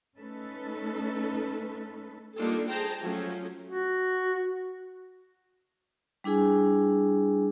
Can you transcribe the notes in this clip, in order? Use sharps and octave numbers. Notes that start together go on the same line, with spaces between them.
A3 C#4 D#4 A4 B4
G3 A#3 D4 D#4 F4 A4
G#4 C5 G5 A5 A#5
F3 F#3 A3 C#4
F#4
G3 D4 E4 G#4 G#5